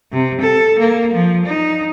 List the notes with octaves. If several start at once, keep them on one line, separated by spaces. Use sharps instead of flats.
C3
A4
A#3
F3
D#4